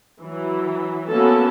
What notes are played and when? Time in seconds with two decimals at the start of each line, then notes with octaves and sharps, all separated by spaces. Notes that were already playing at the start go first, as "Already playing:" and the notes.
0.21 E3 F#3
1.09 A#3 B3 C#4 F#4 A4 A5